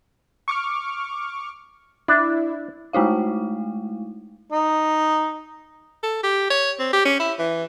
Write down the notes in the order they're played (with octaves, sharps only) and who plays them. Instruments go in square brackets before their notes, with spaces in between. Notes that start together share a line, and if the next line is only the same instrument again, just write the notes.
[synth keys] C#6 D6 F6
[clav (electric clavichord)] D4 [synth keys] E4
[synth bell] G#3 A3 D#4 E4 F5
[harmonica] D#4
[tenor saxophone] A4
G4
C#5
C4
G4
C#4
E4
E3